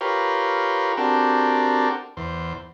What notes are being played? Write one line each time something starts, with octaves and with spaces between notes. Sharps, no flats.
F4 G4 A#4 B4 C#5
C4 D4 F#4 G4 A4 A#4
E2 C5